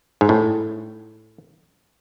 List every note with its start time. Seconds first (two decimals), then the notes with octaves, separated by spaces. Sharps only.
0.21 G#2
0.29 A2